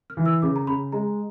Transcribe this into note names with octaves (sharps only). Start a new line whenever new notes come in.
F6
E3
E6
C#3 D6
A#5
C#3 B5
G#3 A#5